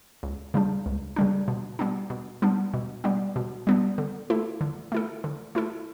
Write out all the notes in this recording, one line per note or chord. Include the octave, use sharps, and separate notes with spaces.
C#2
C#3 G3 D4
C#2
C#3 G3 D4
B2
G3 B3 D4
B2
G3 B3 D4
B2
G3 B3 D4
B2
G3 B3 D4
D3
A3 E4 A4
D3
A3 E4 A4
D3
A3 E4 A4